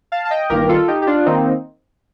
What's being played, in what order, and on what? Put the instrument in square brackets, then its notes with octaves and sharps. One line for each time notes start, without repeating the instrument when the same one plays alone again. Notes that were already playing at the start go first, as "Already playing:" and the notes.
[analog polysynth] F5 A5
A5
D#5 G5
G1 G2 D#3 A#3 G4 A#4
F4 A4
D#4 G4
G4
D4 F4
D#3 A#3 C4 D#4